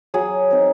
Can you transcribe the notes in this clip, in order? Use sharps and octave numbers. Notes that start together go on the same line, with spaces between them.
F#3 G#4
C4 D#4